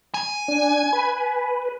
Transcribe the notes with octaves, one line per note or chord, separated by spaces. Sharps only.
G#5
D4
B4